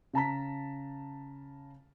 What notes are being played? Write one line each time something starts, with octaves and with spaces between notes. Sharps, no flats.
C#3 A5 A#5 B6